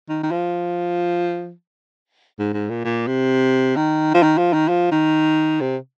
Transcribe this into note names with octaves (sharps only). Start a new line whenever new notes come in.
D#3
D#3
F3
G#2
G#2
A#2
A#2
C3
D#3
F3
D#3
F3
D#3
F3
D#3
C3